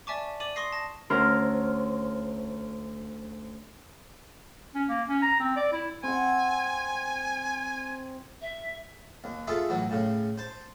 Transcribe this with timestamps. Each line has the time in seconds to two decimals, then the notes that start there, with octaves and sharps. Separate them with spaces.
0.07 D5 E5 G#5 A5 C#6 D6
0.40 D5 D6 D#7 F#7
0.56 C6 C#6 D#6 A#6 C7
0.73 A5 A#6
1.10 D2 C#4 A#4 C5 F6
4.75 C#4
4.89 A#3
5.09 C#4
5.22 A#5
5.40 C4
5.56 D5
5.73 E4
6.03 C4 F#5 G#5
8.42 E5
9.24 D#2
9.47 F4 G#4 A4 C#5 E5
9.69 A2 E3 F#3
9.90 A2 C#3
10.38 C5 A5